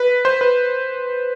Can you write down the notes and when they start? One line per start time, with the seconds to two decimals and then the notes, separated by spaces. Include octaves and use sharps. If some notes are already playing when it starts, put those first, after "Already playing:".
Already playing: B4
0.25 C5
0.41 B4